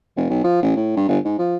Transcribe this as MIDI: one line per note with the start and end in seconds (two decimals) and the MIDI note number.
0.17 0.27 29
0.30 0.42 35
0.44 0.59 53
0.62 0.74 33
0.76 0.93 45
0.97 1.07 43
1.08 1.18 31
1.25 1.36 44
1.39 1.57 53